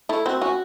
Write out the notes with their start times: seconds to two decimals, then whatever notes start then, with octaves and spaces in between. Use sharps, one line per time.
0.09 A3 E4
0.26 C4 F#4
0.41 C#4 F#4